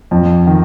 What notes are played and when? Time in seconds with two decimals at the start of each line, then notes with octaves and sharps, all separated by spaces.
0.11 F2
0.47 D#3